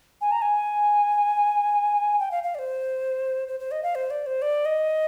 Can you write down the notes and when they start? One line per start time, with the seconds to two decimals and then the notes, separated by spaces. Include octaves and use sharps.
0.21 G#5
0.31 A#5
0.42 G#5
2.19 G5
2.31 F5
2.43 F5
2.55 D5
2.59 C5
3.48 C5
3.60 C5
3.71 D#5
3.83 F5
3.95 C5
4.10 D5
4.26 C5
4.42 D5
4.65 D#5